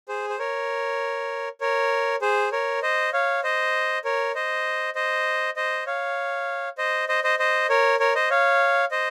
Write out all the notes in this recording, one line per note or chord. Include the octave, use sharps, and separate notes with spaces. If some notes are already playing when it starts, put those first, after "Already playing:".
G#4 C5
C5
A#4 C#5
A#4 C#5
G#4 C5
A#4 C#5
C5 D#5
C#5 F5
C5 D#5
A#4 C#5
C5 D#5
C5 D#5
C5 D#5
C#5 F5
C5 D#5
C5 D#5
C5 D#5
C5 D#5
A#4 C#5
A#4 C#5
C5 D#5
C#5 F5
C5 D#5